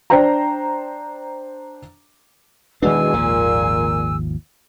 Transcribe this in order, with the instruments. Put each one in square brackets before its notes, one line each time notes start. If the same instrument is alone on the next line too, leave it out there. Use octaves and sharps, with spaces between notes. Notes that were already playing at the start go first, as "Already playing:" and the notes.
[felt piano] D4 C5 G5 A#5
[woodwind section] E2 B2 [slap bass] D#3 G#3 D4 [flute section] G#4 G#5 E6
[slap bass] G#1 D#2 F3 [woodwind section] A#2